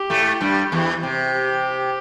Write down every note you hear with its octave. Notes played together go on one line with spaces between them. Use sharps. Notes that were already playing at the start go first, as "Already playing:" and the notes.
Already playing: G4
A2 A3
G2 G3
E2 E3
C3
G4